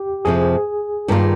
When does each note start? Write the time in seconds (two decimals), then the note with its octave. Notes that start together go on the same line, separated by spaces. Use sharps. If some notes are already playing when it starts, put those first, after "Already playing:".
Already playing: G4
0.25 F2 C3 F3 G#4
1.08 G2 D#3 A#3 F4